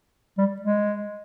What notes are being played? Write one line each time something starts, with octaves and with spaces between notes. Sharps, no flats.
G3
G#3